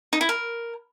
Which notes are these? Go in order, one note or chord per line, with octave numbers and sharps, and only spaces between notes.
D#4
E4
A#4